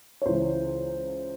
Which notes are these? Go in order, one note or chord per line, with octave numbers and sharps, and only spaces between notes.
C#5
C#2 C#3 E3 C5